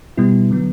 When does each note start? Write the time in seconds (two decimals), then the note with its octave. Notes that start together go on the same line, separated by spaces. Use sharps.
0.17 B2 G3 B3 E4
0.51 D3 F#3 B3